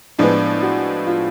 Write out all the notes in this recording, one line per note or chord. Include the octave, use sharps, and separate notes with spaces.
A2 F3 G#3 B3 D4
F#4
F4